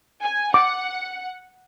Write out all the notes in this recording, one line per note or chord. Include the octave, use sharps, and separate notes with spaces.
G#5
F#5 D6